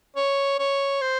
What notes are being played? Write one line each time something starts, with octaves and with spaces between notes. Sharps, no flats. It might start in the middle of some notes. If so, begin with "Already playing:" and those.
C#5
C#5
C5